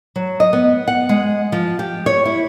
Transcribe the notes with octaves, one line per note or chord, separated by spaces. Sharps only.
F#3
D#5
B3
F#5
G#3
F3
G4
C#5
E4